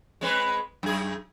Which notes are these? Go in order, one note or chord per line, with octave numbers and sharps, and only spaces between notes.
G#3 C4 B4
F#2 G#4